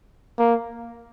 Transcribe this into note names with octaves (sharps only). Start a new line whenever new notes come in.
A#3